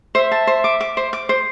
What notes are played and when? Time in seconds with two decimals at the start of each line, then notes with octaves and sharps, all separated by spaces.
0.15 C5 E5
0.31 A5
0.47 C5
0.64 D6
0.81 D6
0.97 C5
1.13 D6
1.29 C5